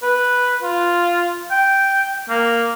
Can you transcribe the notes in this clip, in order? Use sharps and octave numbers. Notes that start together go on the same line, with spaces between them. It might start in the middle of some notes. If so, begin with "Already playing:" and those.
B4
F4
G5
A#3